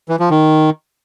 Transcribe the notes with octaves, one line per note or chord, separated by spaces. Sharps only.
E3
F3
D#3